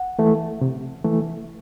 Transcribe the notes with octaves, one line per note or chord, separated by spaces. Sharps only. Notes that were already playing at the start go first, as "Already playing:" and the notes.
Already playing: F#5
E3 A3
C3
E3 A3